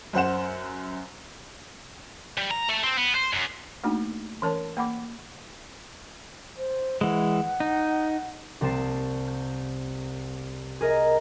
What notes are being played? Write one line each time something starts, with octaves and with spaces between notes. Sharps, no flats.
F#2 C5 F#5 E7
G3
A#5
A3
C4
B3
C5
F#2
A3 A#3 D4 D#4 F#4
E3 C#4 A#4 C#5 A5
A#3 F#5 B5 D6
C5
E3 G#3 F#5
D#4
C2 G3 C4 A5 C7
G6
G#4 A#4 D#5